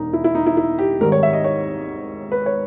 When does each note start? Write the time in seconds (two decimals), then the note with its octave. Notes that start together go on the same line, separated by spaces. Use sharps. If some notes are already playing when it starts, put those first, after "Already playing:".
Already playing: E1 D#2 D#4
0.13 E4
0.24 E4
0.35 D#4
0.46 E4
0.57 E4
0.79 G4
1.00 G#1 G#2 D#3 G3 A#4
1.12 C#5
1.23 E5
1.33 D#5
1.44 C#5
2.32 B4
2.46 C#5